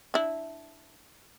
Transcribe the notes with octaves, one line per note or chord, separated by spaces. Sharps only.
D4 E4